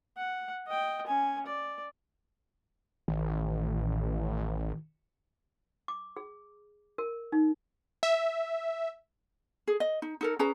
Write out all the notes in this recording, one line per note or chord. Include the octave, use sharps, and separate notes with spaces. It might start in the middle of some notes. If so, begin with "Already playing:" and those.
F#5
D#5 G5
C#4 G#5
D5
A1 D#3
D6
G#4
A#4
D#4
E5
G#4
D#5
D#4
D#4 A4 A#4
C#4 G#4 B4 A#5